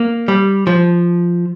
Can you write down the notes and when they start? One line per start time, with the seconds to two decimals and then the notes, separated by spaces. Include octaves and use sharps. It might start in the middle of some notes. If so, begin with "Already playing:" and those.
Already playing: A#3
0.28 G3
0.67 F3